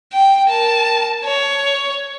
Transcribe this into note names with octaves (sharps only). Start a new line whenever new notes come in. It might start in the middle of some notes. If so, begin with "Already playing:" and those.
G5
A#4 A5
C#5